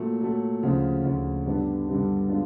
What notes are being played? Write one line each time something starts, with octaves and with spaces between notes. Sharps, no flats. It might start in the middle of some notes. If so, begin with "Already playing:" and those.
Already playing: A#2 F#3 A3
A#2 F#3 A3
D2 C#3 F3
D2 C#3 F3
G2 D3 G3 B3 D4
G2 D3 G3 B3 D4
B2 G#3 B3 D4 F4